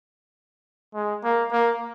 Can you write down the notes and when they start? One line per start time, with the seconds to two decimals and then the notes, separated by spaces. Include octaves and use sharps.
0.94 G#3
1.24 A#3
1.52 A#3